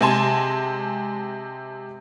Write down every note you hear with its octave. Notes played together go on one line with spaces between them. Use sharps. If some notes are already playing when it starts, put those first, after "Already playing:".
C3 G#3 G#5 A5 C6